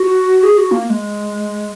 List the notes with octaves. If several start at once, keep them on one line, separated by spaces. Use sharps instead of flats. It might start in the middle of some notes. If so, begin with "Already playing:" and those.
Already playing: F#4
G#4
F#4
A#3
A#3
G#3